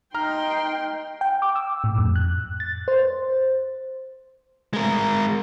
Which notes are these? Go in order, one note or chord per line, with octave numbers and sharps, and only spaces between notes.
D#4 G5 A#5 C6 F6
G5
D6
E6
A2
F2
F#6
A6
C5
G#3 A#4